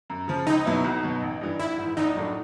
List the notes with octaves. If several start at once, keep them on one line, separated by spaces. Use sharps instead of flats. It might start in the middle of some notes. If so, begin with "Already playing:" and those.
F#2
C#3 F3
C#2 D#4
B2 F#3 B3 E4
B1
B2 F#3
A1
G2 E3
A#1 E4
G#2
E3
A#1 D#4
A2 F#3 A3 D4